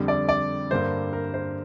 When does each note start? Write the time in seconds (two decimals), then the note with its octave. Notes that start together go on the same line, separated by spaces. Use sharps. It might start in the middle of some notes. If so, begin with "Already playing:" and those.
Already playing: F2 D3 G3
0.08 D5
0.29 D5
0.71 G2 D3 A#3 C5
1.13 A#4
1.34 C5